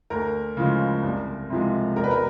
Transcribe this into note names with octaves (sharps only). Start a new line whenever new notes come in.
D2 A#4
C#3 F3 G#3
C2
C3 F3 G#3
E1 A#4
B4
A#4